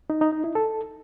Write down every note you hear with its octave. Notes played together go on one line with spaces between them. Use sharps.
D#4
D#4
D#4
E4
A4